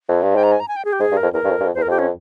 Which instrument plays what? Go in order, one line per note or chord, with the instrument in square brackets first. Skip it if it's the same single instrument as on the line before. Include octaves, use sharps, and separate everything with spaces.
[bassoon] F2
G2
[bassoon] G#2 [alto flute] G5
[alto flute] A#5
G#5
A#5
G#5
G5
G#4
G4
[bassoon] G#2 [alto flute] G#4
[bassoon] G2
[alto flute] A#4
[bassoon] F2
[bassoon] E2 [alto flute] A#4
[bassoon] G2
F2
G2
F2
[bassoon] E2 [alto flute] C5
[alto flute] A#4
[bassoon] F2 [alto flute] G4
[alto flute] C#4